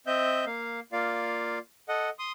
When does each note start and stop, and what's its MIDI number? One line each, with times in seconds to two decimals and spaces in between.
0.07 0.45 60
0.07 0.45 75
0.07 0.45 76
0.07 0.45 91
0.46 0.80 58
0.46 0.80 77
0.92 1.59 58
0.92 1.59 65
0.92 1.59 74
0.92 1.59 77
1.89 2.10 69
1.89 2.10 75
1.89 2.10 78
2.19 2.32 84
2.19 2.32 87